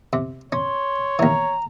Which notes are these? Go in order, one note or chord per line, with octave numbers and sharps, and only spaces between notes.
C3
C#4 C#5 C6
D#2 E3 A#5